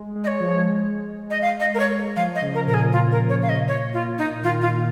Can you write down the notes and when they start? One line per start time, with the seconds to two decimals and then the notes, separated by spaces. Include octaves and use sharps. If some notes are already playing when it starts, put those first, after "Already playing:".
Already playing: G#3
0.16 G#3
0.24 D#5
0.27 C#5
0.40 F3
0.66 G#3
1.30 D#5
1.41 F5
1.60 D#5
1.74 A#4
1.79 C#5
2.16 F3 F5
2.35 D#5
2.42 C#3
2.54 A#4
2.67 A#2 A#4
2.74 G#4
2.92 F4
3.12 A#4
3.29 C#5
3.42 F5
3.49 D#5
3.68 C#5
3.93 F4
4.18 D#4
4.43 D#3 F4
4.61 F4